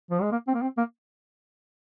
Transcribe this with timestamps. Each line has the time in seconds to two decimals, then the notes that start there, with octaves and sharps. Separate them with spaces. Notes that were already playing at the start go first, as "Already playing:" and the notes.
0.11 F3
0.22 G#3
0.32 A#3
0.47 C4
0.54 A#3
0.62 C4
0.78 A#3